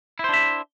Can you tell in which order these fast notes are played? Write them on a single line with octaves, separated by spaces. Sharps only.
E4 C5 D4 E5